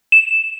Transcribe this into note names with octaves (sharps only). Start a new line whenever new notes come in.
E7